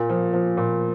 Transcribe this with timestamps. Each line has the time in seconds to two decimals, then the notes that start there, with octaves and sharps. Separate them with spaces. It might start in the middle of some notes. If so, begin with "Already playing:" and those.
Already playing: A#2
0.09 F3
0.33 F3
0.57 A#2